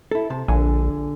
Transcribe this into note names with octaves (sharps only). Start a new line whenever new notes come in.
E4 A4
C3 A5
A#1 D3 G#5